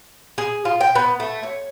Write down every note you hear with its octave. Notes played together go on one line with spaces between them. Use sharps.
G#4
F4
G5
B3
A3
C#5